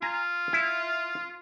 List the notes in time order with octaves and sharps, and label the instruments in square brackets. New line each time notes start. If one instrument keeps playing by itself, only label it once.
[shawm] F4 [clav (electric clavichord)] G#5 A#5
[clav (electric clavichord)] E4